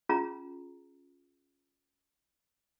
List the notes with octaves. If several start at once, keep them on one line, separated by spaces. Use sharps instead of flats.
C#4 F4 G#4 A#5